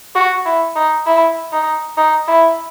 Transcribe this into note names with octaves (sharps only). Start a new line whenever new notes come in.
F#4
E4
D#4
E4
D#4
D#4
E4